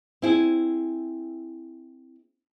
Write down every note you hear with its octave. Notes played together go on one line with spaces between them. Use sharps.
C4 E4 G#4